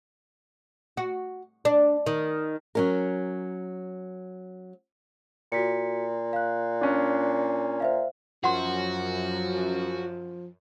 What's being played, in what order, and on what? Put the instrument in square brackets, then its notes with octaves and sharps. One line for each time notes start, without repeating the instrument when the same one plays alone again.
[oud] F#4
D4
D#3
[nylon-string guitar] F#3 C#4 A#4
[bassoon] A#2 [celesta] F#4 B6 C#7
[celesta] F5 F#6
[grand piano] C#4 D4
[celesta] C5 E5 F5
[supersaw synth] F#2 [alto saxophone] F3 [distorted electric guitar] F#4 [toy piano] F#5 C6